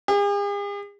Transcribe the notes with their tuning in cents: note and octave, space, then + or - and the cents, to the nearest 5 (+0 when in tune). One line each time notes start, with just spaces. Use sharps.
G#4 -45